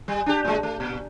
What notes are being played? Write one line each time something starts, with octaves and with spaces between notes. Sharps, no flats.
G3
D4 G4
A2 G#3
A3
A#2